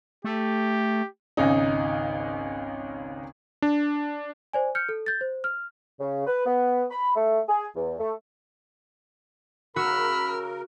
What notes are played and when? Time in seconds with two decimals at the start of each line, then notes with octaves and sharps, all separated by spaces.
0.24 A3 G4
1.37 G#1 C#2 C#4 D#4
3.62 D4
4.53 C5 D5 G#5
4.75 F6 G6 C#7
4.89 A4
5.06 G6 A6
5.21 C5
5.44 F6
6.00 C#3
6.27 B4
6.46 B3
6.91 B5
7.16 A3
7.49 G#4
7.76 E2
7.99 A3
9.76 C#3 F#4 A#4 B5 E6 F6